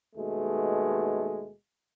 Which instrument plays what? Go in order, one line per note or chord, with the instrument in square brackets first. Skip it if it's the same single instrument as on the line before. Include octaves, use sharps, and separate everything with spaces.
[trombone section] D#2 B2 G#3 A3